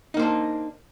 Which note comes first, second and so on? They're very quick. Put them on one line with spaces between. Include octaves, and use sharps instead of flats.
D#4 A#3 C5 D4